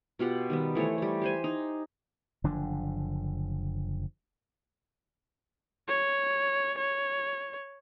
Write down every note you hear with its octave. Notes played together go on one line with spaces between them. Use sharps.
B2 F4 G4 F#5
D#3 G3 B3
E3 A3 C5 C#5
G3 A3
G4 C5 G#5
D#4
F#1 D3 F3 D4
C#5
C#5